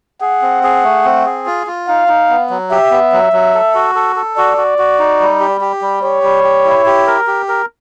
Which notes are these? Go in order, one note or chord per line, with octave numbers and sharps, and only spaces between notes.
G#4 F#5
C4
G#4
A3
C4
G#4
F4
F4
D#4 F5
D#4
B3
F#3
G4 E5
B3
F#3
F#3
A4
F#4
A4
A4
F#4 D5
F#4
F#4
D#4
G3
G4
G4
G3
G4 C#5
G3
G4
E4
G4
A#4
G4
A#4